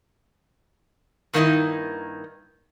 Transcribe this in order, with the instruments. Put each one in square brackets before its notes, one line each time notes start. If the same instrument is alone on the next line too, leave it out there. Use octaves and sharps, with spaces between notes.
[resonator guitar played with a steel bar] G2 D#3 A#3 C4 D#4 E4